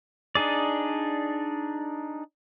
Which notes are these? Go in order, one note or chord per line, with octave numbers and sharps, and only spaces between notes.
D4 D#4 G#4 D5